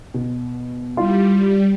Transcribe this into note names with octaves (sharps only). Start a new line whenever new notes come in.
B2
G3 E4 F4 C6